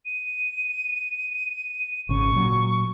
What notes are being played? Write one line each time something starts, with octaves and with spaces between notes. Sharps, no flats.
D#7
G#1 C#3 C#6
A#2 F#3